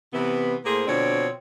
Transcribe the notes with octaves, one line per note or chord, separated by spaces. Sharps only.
C3 E3 B3
A2 A#3 G#4 C5
B2 D3 F3 C4 D4 C#5